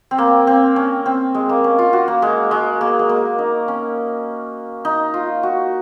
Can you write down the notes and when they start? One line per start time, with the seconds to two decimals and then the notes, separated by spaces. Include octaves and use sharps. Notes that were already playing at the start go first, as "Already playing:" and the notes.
0.11 C4
0.18 A#3
0.47 C4
0.76 C#4
1.06 C4
1.34 G#3
1.49 A#3
1.64 C#4
1.78 F4
1.93 F#4
2.08 A#3
2.22 G#3
2.51 G#3
2.81 A#3
2.99 G#3
3.09 A#3
3.38 D#4
3.68 C#4
4.85 D#4
5.14 F4
5.43 F#4